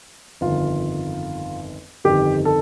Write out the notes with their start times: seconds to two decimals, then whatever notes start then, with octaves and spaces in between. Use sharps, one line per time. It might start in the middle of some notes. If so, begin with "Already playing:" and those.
0.41 G1 F2 D#3 F4
2.04 G1 F2 D#3 G4
2.45 A4